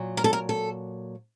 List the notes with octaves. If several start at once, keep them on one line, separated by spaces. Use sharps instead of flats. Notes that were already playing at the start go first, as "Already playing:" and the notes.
Already playing: A#2 F#3
A#4
A4
A#4
A4